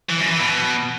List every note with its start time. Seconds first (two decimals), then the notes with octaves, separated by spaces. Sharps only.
0.10 E3
0.20 F#2
0.30 E3
0.40 B2